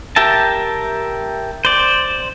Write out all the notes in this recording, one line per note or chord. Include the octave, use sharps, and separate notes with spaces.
G4 A#4 E5 A5
C5 D5